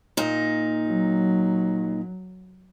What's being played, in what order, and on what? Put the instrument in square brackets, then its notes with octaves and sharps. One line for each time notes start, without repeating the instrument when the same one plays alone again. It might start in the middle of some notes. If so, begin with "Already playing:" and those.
[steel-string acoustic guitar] A#2 D#4
[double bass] F#3